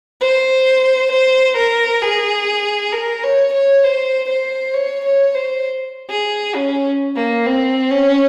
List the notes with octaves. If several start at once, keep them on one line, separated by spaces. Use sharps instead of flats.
C5
C5
A#4
G#4
A#4
C#5
C#5
C5
C5
C#5
C#5
C5
G#4
C#4
A#3
C4
C#4